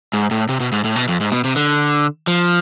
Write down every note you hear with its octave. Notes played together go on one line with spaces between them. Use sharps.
G#2
A2
C3
B2
G#2
A2
B2
F2
G#2
B2
C3
D3
F3